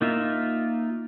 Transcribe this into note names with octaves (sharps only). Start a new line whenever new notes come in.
A#3 D#4 F4 E5